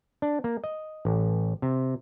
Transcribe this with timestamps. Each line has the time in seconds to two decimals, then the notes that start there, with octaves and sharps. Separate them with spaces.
0.22 D4
0.44 A#3
0.64 D#5
1.05 A1
1.62 C3